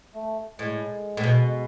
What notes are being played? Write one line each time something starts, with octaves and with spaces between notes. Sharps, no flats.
A3
A2 G#3
A2
B2